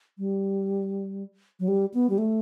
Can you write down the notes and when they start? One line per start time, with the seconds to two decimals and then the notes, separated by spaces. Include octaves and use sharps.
0.18 G3
1.60 F#3
1.68 G3
1.94 B3
2.10 G3
2.18 A3